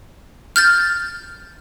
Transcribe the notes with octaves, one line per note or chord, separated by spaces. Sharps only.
F6 G6 A6